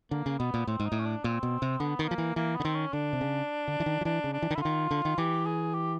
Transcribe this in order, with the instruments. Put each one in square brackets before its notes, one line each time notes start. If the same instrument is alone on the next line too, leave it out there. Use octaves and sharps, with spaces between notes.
[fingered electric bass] D3 [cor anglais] A#3
[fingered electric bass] C#3
[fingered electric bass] B2 [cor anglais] B3
[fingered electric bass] A#2
[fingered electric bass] A2 [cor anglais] C4
[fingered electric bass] G#2
[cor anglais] D#4
[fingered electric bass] A2
[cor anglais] C#4
D4
[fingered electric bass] A#2 [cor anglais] C4
[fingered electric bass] B2
C3
[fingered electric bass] D3 [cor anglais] B3
[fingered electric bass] D#3 [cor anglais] B3
[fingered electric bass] F3 [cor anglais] A#3
[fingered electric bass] E3
[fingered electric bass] E3 [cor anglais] A#3
[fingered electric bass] D3 [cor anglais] B3
[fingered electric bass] D#3 [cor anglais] C4
[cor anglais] C#4
[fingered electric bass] D3 [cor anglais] D4
[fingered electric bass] C3
C#3
D3
E3
D#3
F3
[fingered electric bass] E3 [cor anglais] D4
[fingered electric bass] C#3
[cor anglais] D4
[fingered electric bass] E3
D#3
[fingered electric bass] D3 [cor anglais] E4
[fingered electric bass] D#3 [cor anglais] F4
[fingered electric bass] D3
D#3
[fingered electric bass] E3 [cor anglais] G4
[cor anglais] G#4
G4